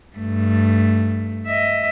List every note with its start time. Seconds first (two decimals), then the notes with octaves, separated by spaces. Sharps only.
0.17 G2 A3
1.46 D#5 E5